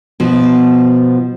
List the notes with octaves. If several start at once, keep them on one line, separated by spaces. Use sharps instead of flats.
B2 F3